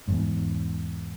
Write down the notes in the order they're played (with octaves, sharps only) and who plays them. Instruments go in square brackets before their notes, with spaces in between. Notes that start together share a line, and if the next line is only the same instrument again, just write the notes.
[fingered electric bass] E2 G#2